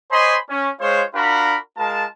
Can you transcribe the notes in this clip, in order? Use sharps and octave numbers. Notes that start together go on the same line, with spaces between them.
C5 C#5 D#5 G#5 B5 C6
C#4
G#3 F4 C5 C#5
D4 F4 F#4 A#4 B5
G#3 F4 A#4 A5